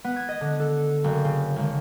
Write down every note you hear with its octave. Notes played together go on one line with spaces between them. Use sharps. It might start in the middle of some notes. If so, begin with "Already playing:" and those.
B3
G#6
D#5
D3
A4
F#1
C#3
G#1